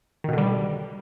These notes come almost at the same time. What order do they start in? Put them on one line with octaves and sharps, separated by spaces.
D#3 B2 D3 G3